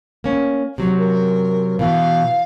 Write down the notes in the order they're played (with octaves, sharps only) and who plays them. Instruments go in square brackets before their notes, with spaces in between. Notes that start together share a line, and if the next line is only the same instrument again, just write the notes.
[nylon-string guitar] A#3 C#4
C3 F#3
[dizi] A#4
[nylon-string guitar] B2 E3 [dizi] F5